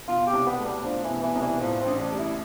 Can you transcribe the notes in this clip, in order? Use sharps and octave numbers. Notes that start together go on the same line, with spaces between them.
B2 F4
G4
C2
B3
A3
G3
F3 D4
E3
B2
E3
C2
E3
A2 F3
C4
A1
D4
G3
E4